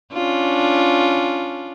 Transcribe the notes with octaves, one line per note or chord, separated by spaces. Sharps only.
C#4 D4 F4